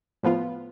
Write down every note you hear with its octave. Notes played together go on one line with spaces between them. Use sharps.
A2 F3 B3 F4